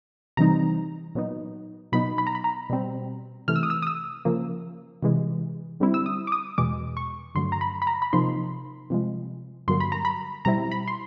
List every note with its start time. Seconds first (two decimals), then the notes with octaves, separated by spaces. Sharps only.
0.37 C3 E3 G3 C4 D#4 A#5
1.15 A#2 F#3 B3 D#4
1.92 B2 F#3 B3 D#4 B5
2.18 B5
2.27 A#5
2.35 B5
2.44 A#5
2.70 B2 G3 C4
3.48 C3 E3 A3 F6
3.56 E6
3.63 D#6
3.70 E6
3.82 D#6
3.87 E6
4.25 C#3 F3 A#3
5.03 C3 E3 G#3
5.80 D3 G3 C4 E4
5.94 E6
6.06 D#6
6.27 D6
6.32 D#6
6.58 E2 B2 G#3 D6
6.97 C#6
7.35 G2 D3 F#3 A3 C6
7.52 A#5
7.61 B5
7.82 B5
7.87 A#5
8.02 B5
8.13 C3 F3 A#3 D#4 C6
8.90 C3 F3 G#3
9.68 G2 D3 F#3 A#3 C6
9.80 B5
9.92 A#5
10.05 B5
10.45 B2 G3 C4 E4 A#5
10.72 B5
10.88 C6